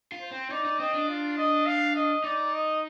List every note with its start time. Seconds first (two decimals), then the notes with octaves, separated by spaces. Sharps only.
0.12 F4
0.21 C5
0.31 C4
0.50 D#4 D5
0.65 D#4
0.79 C4 D#5
0.94 D4
1.09 F4
1.37 D#5
1.66 F5
1.96 D#5
2.24 D#4 D5
2.53 D#5